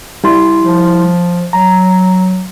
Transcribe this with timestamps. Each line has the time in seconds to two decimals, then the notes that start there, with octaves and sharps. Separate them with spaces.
0.24 G3 E4 C6
0.60 F3
1.53 F#3 A#5